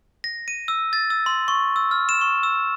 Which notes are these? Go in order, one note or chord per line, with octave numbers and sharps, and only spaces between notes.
A#6
D#7
E6
A6
E6
C6
C#6
E6
F6
E7
C#6
E6